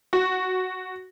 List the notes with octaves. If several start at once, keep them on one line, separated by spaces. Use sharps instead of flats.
F#4